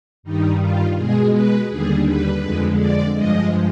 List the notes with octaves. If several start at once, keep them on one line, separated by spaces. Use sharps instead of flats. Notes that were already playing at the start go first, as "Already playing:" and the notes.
G2 D#3 G3 D#4
F4
B2 G#3 G#4
B4
D#2 D3 G3 G#4
B4
F2 D3 G#3
D5
G2 F3 G#3 D#5